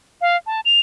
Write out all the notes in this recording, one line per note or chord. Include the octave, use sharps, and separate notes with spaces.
F5
A5
F7